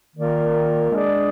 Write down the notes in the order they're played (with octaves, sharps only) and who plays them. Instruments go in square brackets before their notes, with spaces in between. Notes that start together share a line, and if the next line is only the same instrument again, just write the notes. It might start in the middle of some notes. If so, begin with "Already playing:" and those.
[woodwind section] D#3 A#3 F4 A#4 D5
G#3 D4 G#4 D5